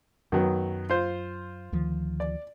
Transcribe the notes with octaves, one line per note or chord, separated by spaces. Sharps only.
F#2 D#3 F#3 B3
F4 C5
D2 D#3 F3
D5